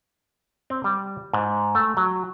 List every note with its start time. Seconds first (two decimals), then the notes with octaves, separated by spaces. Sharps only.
0.70 C4
0.84 G3
1.33 G#2
1.75 A3
1.97 F#3